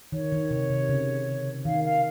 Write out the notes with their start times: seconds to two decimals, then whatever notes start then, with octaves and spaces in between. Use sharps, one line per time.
0.12 D#3 C#5
0.32 D#3
0.51 C3
0.70 C3
0.89 C#3
1.65 D#3 F5
1.84 F5